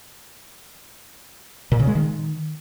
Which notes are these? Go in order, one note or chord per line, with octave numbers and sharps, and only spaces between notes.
A#2
C#3
G#3
D#3